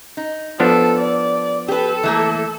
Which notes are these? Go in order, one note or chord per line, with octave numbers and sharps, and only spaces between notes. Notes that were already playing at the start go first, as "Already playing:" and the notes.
D#4
F3 B3 D4 A4
D5
G4 A4 B4
E3 A3 A#3